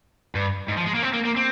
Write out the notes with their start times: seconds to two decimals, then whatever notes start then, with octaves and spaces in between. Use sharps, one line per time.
0.35 G2
0.69 G#2
0.77 F3
0.86 G#3
0.95 A#3
1.03 C4
1.14 A#3
1.25 A#3
1.37 C4